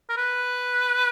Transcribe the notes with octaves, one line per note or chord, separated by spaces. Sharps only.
A#4
B4